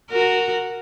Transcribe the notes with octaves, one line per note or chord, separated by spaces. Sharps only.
F#4 A#4